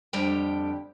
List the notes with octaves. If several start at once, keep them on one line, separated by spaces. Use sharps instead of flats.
F2 D3 G3 G4 G5